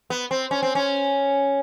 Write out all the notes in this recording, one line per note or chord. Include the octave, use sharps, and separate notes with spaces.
B3
C4
C#4
C4
C#4